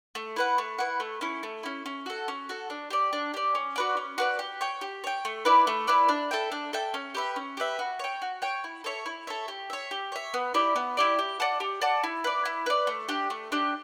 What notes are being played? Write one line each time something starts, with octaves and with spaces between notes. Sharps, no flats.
A3
E4 B4 F#5
A3
E4 B4 F#5
A3
C#4 E4
A3
C#4 E4
C#4
F#4 A4
C#4
F#4 A4
D4
G4 D5
D4
G4 D5
C#4
F#4 B4 D5
C#4
F#4 B4 D5
G4
C#5 G5
G4
C#5 G5
A3
E4 B4 D5
A3
E4 B4 D5
D4
A4 E5 G5
D4
A4 E5 G5
C#4
G4 B4 E5
C#4
G4 B4 E5
F#4
C#5 G5
F#4
C#5 G5
E4
A4 C#5 E5
E4
A4 C#5 E5
G4
C#5 E5
G4
C#5 E5
B3
E4 G4 D5
B3
E4 G4 D5
G4
D5 F#5 A5
G4
D5 F#5 A5
E4
B4 D5
E4
B4 D5
A3
D4 G4
A3
D4 G4